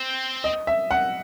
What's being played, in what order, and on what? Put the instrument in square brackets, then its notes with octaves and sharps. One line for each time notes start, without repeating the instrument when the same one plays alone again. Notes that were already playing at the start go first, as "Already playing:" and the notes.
Already playing: [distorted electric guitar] C4
[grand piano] D#5
E5
F#5